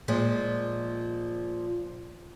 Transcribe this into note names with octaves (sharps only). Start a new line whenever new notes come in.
A#2 F3 G#3